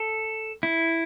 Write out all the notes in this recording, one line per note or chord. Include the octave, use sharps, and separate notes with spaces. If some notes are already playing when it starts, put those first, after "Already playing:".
Already playing: A4
E4